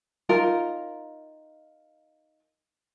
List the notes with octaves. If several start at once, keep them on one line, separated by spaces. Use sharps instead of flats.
D#4 F4 A#4